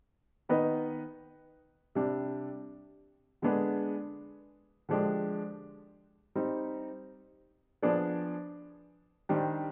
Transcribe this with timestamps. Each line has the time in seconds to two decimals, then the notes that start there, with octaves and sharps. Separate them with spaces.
0.49 D#3 B3 D#4 B4 D#5
1.95 C3 G3 D4
3.42 D3 G#3 B3 D4 G#4
4.89 D3 F3 G#3 D4 G4
6.35 G3 C4 D#4
7.82 F3 B3 D4 G#4 D5
9.29 D#3 G3 D4 G4 C5